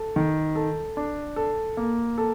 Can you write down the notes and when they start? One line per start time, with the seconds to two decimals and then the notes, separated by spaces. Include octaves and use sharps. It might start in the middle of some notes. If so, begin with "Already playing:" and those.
Already playing: A4
0.16 D#3
0.55 A4
0.97 D4
1.36 A4
1.77 A#3
2.18 A4